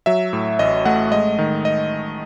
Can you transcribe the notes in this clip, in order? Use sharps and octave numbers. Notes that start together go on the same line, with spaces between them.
F#3 E5
A2
A1 D#5
A3 F#5
G#3 D#5
D#3
D#5